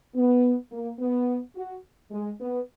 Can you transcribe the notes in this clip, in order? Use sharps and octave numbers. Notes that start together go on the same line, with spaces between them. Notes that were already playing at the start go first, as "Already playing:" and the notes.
B3
A#3
B3
F#4
G#3
B3